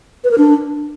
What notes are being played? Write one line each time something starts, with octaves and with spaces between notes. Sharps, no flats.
B4
A#4
D4